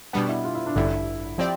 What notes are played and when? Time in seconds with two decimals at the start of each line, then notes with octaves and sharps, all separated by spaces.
0.13 B2 G3 B3 D4
0.29 E4
0.45 F4
0.55 E4
0.66 D4
0.76 A1 G2 D3 E4
1.38 F3 C4 G4 D5